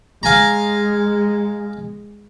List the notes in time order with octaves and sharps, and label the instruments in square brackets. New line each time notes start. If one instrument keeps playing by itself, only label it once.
[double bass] G#3 [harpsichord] F5 G#5 A#5